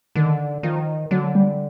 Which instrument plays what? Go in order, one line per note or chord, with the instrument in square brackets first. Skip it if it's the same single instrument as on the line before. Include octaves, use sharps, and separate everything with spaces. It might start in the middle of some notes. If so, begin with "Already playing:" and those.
[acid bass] D3 [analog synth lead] D#3
[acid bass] D#3 [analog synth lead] F3
[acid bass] D3 [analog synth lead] F#3
[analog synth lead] G3